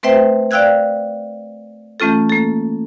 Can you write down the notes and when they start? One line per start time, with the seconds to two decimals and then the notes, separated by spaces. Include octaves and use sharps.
0.03 A3 C4 B4 C5 E5 G5
0.51 D5 F5 G5 E6 F#6 G#6
2.00 E3 A3 C#4 F4 A4
2.29 A#3 A4